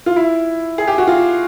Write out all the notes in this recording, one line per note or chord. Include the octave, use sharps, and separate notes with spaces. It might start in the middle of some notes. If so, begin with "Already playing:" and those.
F4
E4
G#4
G4
F#4
F4